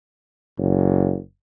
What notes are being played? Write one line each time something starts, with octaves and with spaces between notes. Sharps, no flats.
F#1